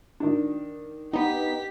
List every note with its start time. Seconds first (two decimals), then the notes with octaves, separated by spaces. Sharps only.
0.20 D#3 D4
1.13 B3 D#4 G4 B6